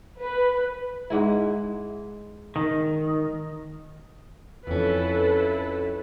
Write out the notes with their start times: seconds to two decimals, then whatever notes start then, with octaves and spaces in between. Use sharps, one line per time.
0.20 B4
1.10 G#2 G#3 E4
2.56 D#3
4.67 F2 C#4 E4 A4 B4